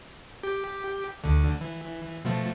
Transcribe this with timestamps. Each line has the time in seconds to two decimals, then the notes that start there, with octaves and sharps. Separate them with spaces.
0.43 G4
1.24 D2 D3
1.61 E3
2.25 B2 F3 A3